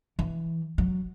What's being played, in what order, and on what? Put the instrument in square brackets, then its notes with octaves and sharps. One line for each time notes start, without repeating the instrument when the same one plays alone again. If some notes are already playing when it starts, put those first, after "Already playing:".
[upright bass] E3
F#3